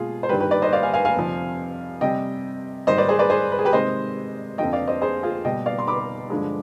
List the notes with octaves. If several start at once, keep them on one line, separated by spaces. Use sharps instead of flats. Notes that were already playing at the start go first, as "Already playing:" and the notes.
Already playing: B2 G#3 F4 G#4
C5
G2 D#3 G3 G4 B4
G4 B4
B4 D5
C5 D#5
D5 F5
F5 G#5
F5 G#5
F5 G#5
F2 C3 F3
C3 G3 D#5 G5
G#2 D#3 G3 C5 D#5
B4 D5
G#4 C5
B4 D5
G#4 C5
B4
G#4
G4 B4
C3 D#3 G#3 C5 D#5
F2 D3 F3 D#5 G5
D5 F5
C5 D#5
G#4 C5
F4 G#4
B2 G3 D#5 G5
D5 F5
C6
B5 D6
G2 D3 F3 G#3